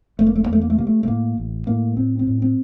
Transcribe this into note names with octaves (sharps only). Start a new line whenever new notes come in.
F1 A3
A#3
A3
A#3
E2 A3
A#3
A3
C3 A#3
A3
A3
A2 A#3
A1
A2 A#3
A2 C4
C4
A2
C4